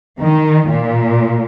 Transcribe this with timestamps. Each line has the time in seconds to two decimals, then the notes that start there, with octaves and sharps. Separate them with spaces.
0.21 D#3
0.70 A#2